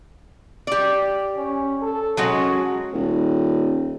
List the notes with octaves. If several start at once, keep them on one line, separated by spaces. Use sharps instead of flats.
G4 D5
C#4
A4
F#3 G#3 C#4 F#4
D#1